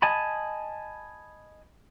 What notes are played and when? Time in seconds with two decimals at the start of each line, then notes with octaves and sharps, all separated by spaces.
0.02 D#5 G#5 A5 B5